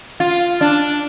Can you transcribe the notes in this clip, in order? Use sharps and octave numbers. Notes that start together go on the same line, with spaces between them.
F4
D4